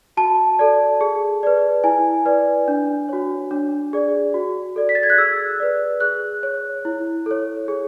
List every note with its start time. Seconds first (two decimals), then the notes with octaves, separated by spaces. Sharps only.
0.17 F#4 A5
0.59 A4 D5
1.01 G#4
1.43 B4 D5
1.84 E4 G#5
2.26 B4 D5
2.68 D4
3.09 F#4 C#5
3.51 D4
3.93 G#4 D5
4.34 F#4
4.76 A4 D5
4.89 B6
4.95 A6
5.03 G#6
5.10 F#6
5.18 G#4 E6
5.60 B4 D5
6.00 G#4 F#6
6.43 C#5
6.85 E4
7.26 A4 C#5
7.68 G#4